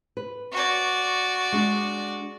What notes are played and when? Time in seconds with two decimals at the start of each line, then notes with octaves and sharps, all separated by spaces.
0.17 B4
0.52 F#4 D5
1.52 G#3 D4